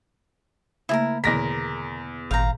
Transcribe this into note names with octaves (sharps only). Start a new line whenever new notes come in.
C#3 A3 A#3 E4 G#4 A#4
E2 B2 D3 A#4 A#6 B6
G#1 A#2 F5 A#5 G6